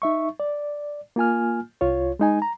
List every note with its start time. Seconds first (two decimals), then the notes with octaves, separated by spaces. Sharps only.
0.02 D#4 E5 C#6
0.40 D5
1.16 A#3 F4 G#5 F6
1.81 C2 F4 C#5
2.20 G#3 D#4 G#5
2.42 A#5